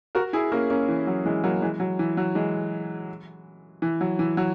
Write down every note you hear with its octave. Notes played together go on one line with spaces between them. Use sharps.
F#4 A#4
E4 G#4
A#3 C#4
A#3 C#4
E3
F#3
E3 G#3
F#3 A#3
E3 G#3
F#3
E3
F#3
E3 G#3
E3
F#3
E3
F#3